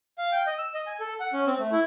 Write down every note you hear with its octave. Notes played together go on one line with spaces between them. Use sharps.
F5
G5
D#5
E6
D#5
G#5
A4
F#5
C#4
C4
A3
E4